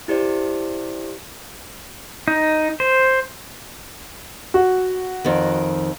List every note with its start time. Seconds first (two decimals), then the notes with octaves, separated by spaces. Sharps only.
0.08 E4 G4 C5 D5
2.28 D#4
2.80 C5
4.54 F#4
5.25 F2 D#3